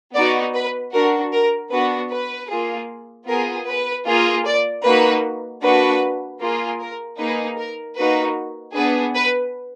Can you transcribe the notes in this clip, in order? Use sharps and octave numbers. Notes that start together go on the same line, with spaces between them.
B3 D#4 F#4 D5
B4
D4 F#4 A#4
A#4
B3 D4 F#4 B4
B4
A#3 F4 G#4
B3 F4 G#4 A#4
B4
A#3 F4 G#4
D5
A#3 D#4 F#4 B4
A#3 D4 F#4 B4
A#3 F4 G#4
A#4
A#3 D#4 G#4 B4
A#4
A#3 D#4 F#4 B4
B3 D4 G#4 B4
B4